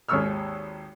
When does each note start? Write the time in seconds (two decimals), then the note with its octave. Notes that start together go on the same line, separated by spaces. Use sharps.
0.09 G#1 D#2 G#3 C#6 E6 F6